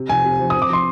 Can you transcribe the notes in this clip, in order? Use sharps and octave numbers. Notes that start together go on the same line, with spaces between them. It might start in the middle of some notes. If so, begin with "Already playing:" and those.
Already playing: C3
F1 G#5
C3
F3
C4 D#6
D6
F3 C6